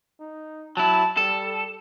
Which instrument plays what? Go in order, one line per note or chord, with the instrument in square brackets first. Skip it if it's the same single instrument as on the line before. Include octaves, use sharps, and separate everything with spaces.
[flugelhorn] D#4
[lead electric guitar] F#3 E4 [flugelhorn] A5
[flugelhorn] G3 [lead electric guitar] A4